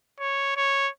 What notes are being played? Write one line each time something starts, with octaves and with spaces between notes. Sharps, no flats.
C#5
C#5